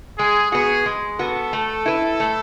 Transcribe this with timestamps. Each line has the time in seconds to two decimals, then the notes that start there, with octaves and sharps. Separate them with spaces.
0.19 G#3 G#4
0.52 B3 F#4 G#4
0.86 G#3
1.19 B3 F#4 A4
1.53 A3
1.86 E4 B4
2.20 A3